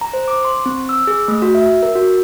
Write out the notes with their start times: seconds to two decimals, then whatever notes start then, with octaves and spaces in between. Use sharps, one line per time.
0.01 A#5
0.13 C5
0.28 D6
0.45 C6
0.66 C4
0.89 E6
1.07 G#4
1.28 A3
1.42 F#4
1.55 E5
1.83 A#4
1.95 F#4